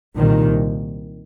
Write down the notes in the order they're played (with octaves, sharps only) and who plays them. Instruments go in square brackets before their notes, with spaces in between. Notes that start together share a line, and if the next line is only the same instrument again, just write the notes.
[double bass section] C2 A#2 D#3